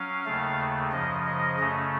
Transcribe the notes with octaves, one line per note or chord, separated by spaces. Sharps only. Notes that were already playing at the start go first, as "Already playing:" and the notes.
Already playing: F#3 C#4 F5
D#2 C#3 A3
F#2 C#3 F3 D#5
D#5
F#2 C#3 A3 C#4